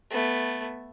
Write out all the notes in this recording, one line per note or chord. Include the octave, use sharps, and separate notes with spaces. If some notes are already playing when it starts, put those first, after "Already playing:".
A3 B3